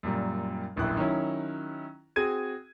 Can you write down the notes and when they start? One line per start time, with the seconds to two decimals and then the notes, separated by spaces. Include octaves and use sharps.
0.03 F#2 A#2 G3
0.76 D1 A#1 F#2 E4 G5 F#6
0.97 D#3 F#3 C#4 E4
2.16 C4 F#4 G#4 G#6 D#7